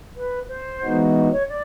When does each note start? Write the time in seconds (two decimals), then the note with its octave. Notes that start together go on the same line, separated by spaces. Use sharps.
0.16 B4
0.49 C5
0.82 E3 G#3 B3 D#4 F#4
1.32 C#5
1.49 D5